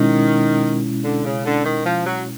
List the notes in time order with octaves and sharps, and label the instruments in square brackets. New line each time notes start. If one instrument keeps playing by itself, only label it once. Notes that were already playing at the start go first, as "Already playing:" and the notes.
Already playing: [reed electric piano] B2 G#3 C#4 E4 [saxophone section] D#3
[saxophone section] D3
C#3
D3
D#3
F3
F#3